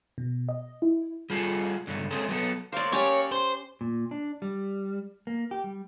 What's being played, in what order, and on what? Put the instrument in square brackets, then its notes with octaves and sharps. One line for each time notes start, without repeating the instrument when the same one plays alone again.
[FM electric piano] B2
D#5
E4
[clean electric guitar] G3 F4 G#4 A4
C#2 G2 D3
G#3 C4 C#4 G#4 A4 C5
F#3 B3 A4
[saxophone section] F#3 A#3 [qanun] C5 D5
[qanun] C#4 G4 D5 [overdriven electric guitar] C#5
[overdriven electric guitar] C5
[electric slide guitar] A#2
D4
G3
A#3
G4
G3